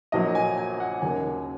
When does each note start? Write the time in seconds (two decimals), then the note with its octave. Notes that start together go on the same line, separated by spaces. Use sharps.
0.12 A#1 A#2 F#3 A#3 D#5
0.35 G#5
0.58 G#5
0.80 F#5
1.02 D#2 C#3 F#3 A#3 G#5